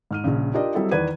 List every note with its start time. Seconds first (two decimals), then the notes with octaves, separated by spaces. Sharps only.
0.11 G#2 F6 D#7
0.24 A#1 C#3
0.54 D4 F4 G4 A#4 D5 D#5
0.74 F#3 G3 C4 E4 A4 D#5
0.91 E2 D#3 B4 D5 G#6 D#7